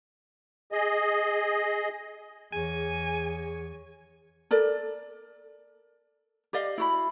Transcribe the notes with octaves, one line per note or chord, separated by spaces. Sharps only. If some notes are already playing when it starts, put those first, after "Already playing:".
G#4 D#5
E2 G#4 C#5 G#5
A4 A#4 D5
G4 D5 D#5 F5
E4 F#4 B5